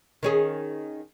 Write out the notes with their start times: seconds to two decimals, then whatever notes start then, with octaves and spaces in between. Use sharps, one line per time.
0.23 D#3 C#4 G#4